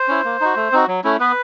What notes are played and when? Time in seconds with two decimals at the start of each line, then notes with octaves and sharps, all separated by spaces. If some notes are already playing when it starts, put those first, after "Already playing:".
Already playing: C5
0.08 C#4 E4
0.24 A#3
0.41 D#4 F#4
0.56 A3
0.72 C4 D#4 F#4
0.88 F#3
1.04 A3 C#4 E4
1.19 B3 B4